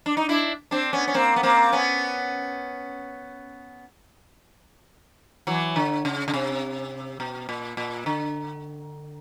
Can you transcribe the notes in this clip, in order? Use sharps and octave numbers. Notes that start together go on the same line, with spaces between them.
D4
D#4
D4 E4
C4 D4
B3 C#4
C#4
A#3 C4
B3
A#3 C4
B3 C#4
E3 F#3
D3
C#3
C#3
C3
B2
A#2
A#2
D3